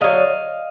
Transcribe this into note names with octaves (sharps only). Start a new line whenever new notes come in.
D3 F#3 A3 D#5 F5